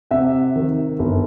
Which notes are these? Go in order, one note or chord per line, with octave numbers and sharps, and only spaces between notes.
C3 E5 F#5
D#3
G1